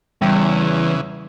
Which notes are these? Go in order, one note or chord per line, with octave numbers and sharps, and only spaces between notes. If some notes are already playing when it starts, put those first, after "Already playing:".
E2 C#3 E3 G3